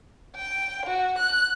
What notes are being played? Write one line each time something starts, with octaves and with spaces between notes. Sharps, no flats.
G5
F#4
F#6